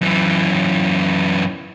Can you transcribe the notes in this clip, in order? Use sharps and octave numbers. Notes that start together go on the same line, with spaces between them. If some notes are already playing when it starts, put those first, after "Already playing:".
F#2 E3